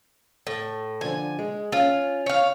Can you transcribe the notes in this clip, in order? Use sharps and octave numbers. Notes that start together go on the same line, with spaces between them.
A2
D3 F3 G#5
G#3
C#4 F4
C#5 F5